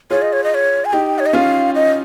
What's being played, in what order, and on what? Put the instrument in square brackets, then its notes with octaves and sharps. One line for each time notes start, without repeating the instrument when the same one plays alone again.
[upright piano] F4 G#4 [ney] C#5
[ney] D#5
C#5
D#5
C#5
G#5
[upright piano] D#4 G4 [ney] G5
[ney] C#5
D#5
[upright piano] C#4 F4 [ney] F5
[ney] D#5